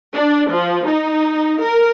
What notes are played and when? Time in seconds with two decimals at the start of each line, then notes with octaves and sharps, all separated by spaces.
0.14 D4
0.50 F3
0.86 D#4
1.61 A#4